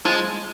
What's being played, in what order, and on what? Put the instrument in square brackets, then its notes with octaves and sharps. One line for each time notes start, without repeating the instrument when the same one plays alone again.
[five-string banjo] F3 F4 [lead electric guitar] G#3